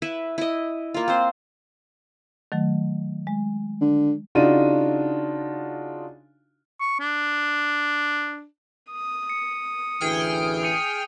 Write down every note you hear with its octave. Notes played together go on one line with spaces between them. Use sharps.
E4 B4 E5
E4 D#5
A#3 F4
C4 C5
D#3 F#3 A3
G#3
D3
C#3 D4 D#4 F4 F#4 D#7
C#6
D4
D#6
C#7
A1 D2 E3 G#4 G5 F6
D#6 C#7 D#7